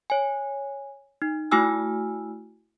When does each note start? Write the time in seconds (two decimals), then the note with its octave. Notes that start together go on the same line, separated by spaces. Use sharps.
0.10 C#5 G#5
1.22 D#4
1.51 A3 E4 F#4 G#5 E6 F6